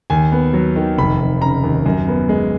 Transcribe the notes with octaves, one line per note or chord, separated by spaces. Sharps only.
D#2 G#5
B3
F#3
D#3
F1 B5
F1
C#3 A#5
D#2
F#2
B3
G#3